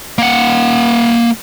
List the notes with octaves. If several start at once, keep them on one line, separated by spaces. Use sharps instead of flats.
A#3 F#5